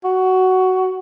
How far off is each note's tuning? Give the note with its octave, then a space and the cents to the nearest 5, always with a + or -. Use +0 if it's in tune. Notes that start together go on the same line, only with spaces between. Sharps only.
F#4 +10